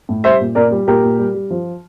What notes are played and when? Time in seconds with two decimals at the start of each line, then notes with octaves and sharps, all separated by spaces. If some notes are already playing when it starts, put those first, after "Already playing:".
0.09 A2
0.24 G3 C5 E5
0.40 A#2
0.55 A#2 A#4 D5
0.71 G3
0.87 A#2 G4 A#4
1.03 A#2
1.19 G3
1.34 G3
1.50 F3